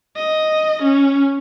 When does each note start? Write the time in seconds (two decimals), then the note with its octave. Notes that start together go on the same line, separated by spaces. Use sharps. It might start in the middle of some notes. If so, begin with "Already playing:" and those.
0.16 D#5
0.82 C#4